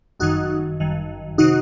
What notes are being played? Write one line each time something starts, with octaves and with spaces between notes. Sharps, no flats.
G1 F#2 D#3 D#4 F#4
G1 F#2 D#3
C3 D#3 D#4 F#4